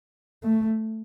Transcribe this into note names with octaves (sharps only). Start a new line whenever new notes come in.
A3